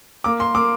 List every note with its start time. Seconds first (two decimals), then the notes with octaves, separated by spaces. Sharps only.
0.24 A#3 D6
0.40 C6
0.55 A#3 D6